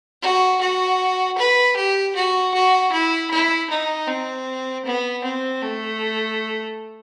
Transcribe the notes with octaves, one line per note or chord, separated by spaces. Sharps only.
F#4
F#4
B4
G4
F#4
F#4
E4
E4
D#4
C4
B3
C4
A3